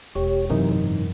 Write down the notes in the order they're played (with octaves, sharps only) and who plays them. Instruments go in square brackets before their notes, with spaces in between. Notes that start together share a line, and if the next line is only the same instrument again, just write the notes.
[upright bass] E1 [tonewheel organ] G4 C#5
[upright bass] F#2 [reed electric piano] C3 E3 D#4 [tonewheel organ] A#4
[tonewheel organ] G#2